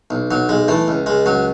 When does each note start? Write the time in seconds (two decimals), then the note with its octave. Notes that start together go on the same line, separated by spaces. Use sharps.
0.10 B1
0.31 B1 F#3
0.49 B1 G#3
0.68 E3 A3
0.88 C#2
1.06 C#2 G#3
1.26 C#2 F#3